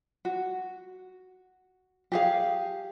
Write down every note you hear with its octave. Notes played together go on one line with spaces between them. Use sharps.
F#4
G4 G#4 F5